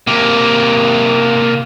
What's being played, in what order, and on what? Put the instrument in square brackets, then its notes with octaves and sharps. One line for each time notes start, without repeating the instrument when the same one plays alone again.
[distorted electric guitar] C3 A#3